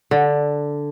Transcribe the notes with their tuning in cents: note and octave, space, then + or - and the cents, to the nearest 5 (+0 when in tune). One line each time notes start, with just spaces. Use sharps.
D3 -5